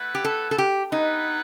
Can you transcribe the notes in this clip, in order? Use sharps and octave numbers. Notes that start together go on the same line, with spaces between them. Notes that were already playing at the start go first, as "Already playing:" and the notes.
Already playing: A3 E4 B4 F#5
G4
A4
A4
G4
B3 D#4 E4 B4 F#5